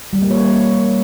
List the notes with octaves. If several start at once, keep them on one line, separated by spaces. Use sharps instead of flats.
G3
A#3
C#5
A#4